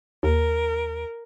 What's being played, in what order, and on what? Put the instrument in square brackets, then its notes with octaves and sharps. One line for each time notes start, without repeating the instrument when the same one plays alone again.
[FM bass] D#2 [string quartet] A#4